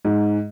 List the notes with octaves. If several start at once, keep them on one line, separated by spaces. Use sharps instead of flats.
G#2